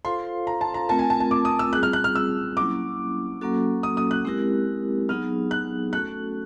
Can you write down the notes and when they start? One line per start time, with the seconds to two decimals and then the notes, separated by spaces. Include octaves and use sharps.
0.05 F4 A4 C5 F5 C6
0.47 A#5
0.61 A5
0.74 A#5
0.89 A3 C4 F4 A#4 A5
0.99 G#5
1.10 A5
1.20 A5
1.31 D6
1.45 D#6
1.59 E6
1.73 G3 C4 F4 G#4 F#6
1.83 F6
1.93 F#6
2.04 F6
2.15 E6
2.57 F#3 A#3 C#4 E4 D6
3.41 F#3 A#3 C#4 F#4 A4
3.83 D#6
3.97 D#6
4.11 F#6
4.25 G#3 C4 E4 G4 A#4
5.09 F#3 B3 D#4 G#4 F6
5.51 F#6
5.92 A3 C#4 F#4 A4 F#6